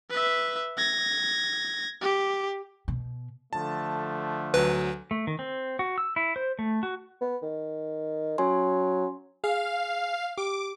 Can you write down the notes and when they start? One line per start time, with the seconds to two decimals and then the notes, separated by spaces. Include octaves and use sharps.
0.10 B4 E5
0.77 G#6 A#6
2.01 G4
2.88 B2
3.53 D3 F3 A3 A5
4.54 D2 F#3 B4
5.11 A3
5.27 D#3
5.39 C4
5.79 F#4
5.98 E6
6.16 E4
6.36 C5
6.59 A3
6.83 F#4
7.21 B3
7.42 D#3
8.38 F#3 C#4 G#5 C6
9.44 G#4 F5
10.38 G4 D6